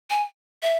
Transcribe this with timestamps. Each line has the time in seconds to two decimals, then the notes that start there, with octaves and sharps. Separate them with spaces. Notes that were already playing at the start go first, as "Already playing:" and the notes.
0.10 G#5
0.63 E5